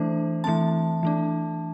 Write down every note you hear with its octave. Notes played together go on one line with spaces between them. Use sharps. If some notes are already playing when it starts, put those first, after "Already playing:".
Already playing: E3 A3 D4 C5
E3 A3 C4 A5
E3 A3 D4